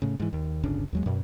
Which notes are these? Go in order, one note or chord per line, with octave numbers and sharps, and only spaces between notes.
A2 C#3
G#2 E3
D#2
D1 G1 C#3 D4
D#2 F#3 G#3
F#2 B2